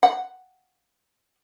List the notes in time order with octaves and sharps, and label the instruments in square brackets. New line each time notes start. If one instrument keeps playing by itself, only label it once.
[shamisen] F#5